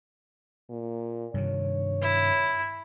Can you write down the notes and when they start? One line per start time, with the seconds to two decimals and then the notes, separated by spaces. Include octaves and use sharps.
0.70 A#2
1.34 G2 C3 D#3 C#5
2.02 E4